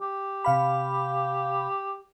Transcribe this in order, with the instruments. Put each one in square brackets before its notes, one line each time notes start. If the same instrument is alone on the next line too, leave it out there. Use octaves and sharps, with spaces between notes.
[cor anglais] G4
[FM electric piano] C3 F5 B5